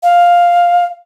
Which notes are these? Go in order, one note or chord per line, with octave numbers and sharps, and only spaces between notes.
F5